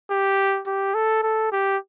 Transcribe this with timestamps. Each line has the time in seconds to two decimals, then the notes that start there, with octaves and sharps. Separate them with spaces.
0.11 G4
0.67 G4
0.94 A4
1.23 A4
1.52 G4